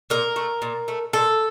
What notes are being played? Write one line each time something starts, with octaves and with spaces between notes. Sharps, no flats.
A#2 A#4
A3
A#2
A3
A#2 A4